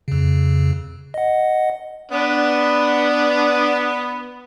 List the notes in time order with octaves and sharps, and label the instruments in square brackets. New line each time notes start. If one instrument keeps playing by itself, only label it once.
[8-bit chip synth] F2 C#3
D#5 F#5
[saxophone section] B3 [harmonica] D4